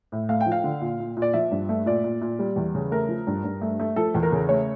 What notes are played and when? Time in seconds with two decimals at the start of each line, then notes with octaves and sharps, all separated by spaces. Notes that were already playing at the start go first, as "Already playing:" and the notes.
0.12 A2
0.29 A3 F5
0.41 G5
0.46 F3
0.52 F5
0.64 D3
0.81 A#2
1.00 A#2
1.17 A#2
1.22 D5
1.34 F3 E5
1.51 G2
1.69 A3
1.86 A#2 D5
2.04 A#2
2.21 A#2
2.39 G3
2.56 E2
2.75 C#3
2.91 A3 A#4
3.09 F3
3.27 G2
3.44 G2
3.62 A3
3.80 A3
3.96 F3 A4
4.15 E2
4.23 A#4
4.32 C#3
4.49 A3 C#5